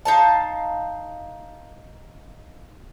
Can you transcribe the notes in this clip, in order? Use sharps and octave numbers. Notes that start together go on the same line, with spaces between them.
D#4 F5 A5